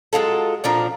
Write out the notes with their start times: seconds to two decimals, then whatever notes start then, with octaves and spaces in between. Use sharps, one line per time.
0.13 F#3 G#3 F4 A4
0.64 A#2 F3 D4 A#5